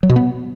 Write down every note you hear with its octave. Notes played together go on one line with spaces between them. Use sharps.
F#3
B2
B3